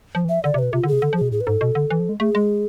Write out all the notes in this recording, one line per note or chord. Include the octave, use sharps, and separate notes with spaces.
F3
E3
F3 E5
D3 D5
C3
B2 B4
C3 F4
D3
C3 G#4
D3 A4
F3
B2 G#4
A2 G#4
B4
G#2 A4
B2
D3
E3
F3
G#3
A3 G#4
G#3